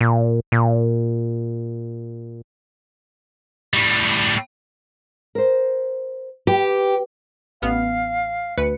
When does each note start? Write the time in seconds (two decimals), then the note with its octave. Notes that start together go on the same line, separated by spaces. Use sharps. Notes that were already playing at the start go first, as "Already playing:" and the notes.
0.01 A#2
0.52 A#2
3.74 A2 G3
5.35 A#4 C5
6.47 G4 B4
7.62 A1 B3 F5 F6
8.57 D2 B4 C#7